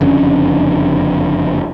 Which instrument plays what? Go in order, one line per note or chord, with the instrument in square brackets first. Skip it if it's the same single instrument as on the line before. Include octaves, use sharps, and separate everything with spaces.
[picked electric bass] F#1 F2 D3 C#4